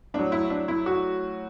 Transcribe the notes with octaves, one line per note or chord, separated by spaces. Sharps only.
A2 F#3 D4
E4
D4
E4
F#4